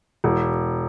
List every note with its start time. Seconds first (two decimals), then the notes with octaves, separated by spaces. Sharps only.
0.24 E1